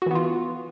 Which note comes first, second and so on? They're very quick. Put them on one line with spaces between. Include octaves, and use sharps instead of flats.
F#4 E3 B3 F4